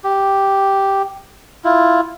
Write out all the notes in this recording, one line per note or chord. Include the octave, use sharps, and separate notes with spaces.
G4
E4 F4